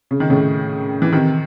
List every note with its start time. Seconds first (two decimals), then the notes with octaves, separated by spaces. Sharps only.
0.11 C#3
0.20 D#3
0.30 A2 C#3
1.02 E3
1.12 C3 D#3